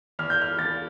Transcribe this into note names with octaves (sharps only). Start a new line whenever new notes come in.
E2 F6
G6
F6
E2 A6